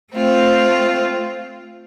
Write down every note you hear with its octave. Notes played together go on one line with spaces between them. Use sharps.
A3 C4 F4